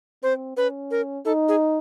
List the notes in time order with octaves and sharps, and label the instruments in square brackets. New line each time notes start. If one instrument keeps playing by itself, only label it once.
[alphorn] C4 [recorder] C5
[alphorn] C#4 [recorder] B4
[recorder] A#4
[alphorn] D#4 [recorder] A4
[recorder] G#4